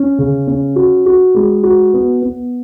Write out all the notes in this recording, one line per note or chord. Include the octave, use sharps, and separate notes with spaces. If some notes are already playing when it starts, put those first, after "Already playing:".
Already playing: C#4
C#3
C#4
F#4
F#4
G#3
F#4
B3
B3